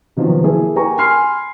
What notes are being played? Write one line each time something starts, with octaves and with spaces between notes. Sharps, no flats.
C3 D#3 F3 F#3 B3
A#3 E4 G#4 A4
G4 A#4 G#5 A#5 C#6
G#5 B5 C6 F6 C7